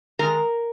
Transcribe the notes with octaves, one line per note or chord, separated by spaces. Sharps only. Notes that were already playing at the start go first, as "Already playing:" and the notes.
D#3 G#3 A#4